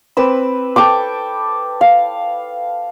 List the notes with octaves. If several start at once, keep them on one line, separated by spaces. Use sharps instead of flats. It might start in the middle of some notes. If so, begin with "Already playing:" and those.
C4 B4 D6 E6
A4 G5 C#6 D6
F5